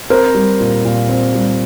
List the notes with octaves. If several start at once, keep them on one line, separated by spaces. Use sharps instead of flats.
C4 A#4 C5
G3
A#2
A#2
C4
G3